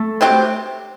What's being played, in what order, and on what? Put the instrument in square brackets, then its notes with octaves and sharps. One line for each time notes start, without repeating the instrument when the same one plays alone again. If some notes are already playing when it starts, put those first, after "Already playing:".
Already playing: [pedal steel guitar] A3 A4
[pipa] C3 F#3 C4 G4